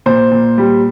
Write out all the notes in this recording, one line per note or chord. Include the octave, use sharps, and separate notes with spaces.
A#2 C5
A#2
G3